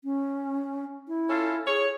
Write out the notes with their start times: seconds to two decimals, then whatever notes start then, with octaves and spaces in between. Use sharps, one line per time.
0.04 C#4
1.08 E4
1.29 C#4 F4 A4
1.67 G#4 C#5